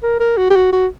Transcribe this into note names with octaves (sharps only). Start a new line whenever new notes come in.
A#4
A#4
F#4
G4
F#4
F#4